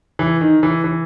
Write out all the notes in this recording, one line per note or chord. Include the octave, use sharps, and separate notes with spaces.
E3
D#3
E3
E3